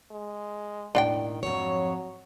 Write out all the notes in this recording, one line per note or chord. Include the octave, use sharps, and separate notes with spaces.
G#3
E1 A2 D#3 D4 F#5 G5
F2 G#2 F3 F#3 C#5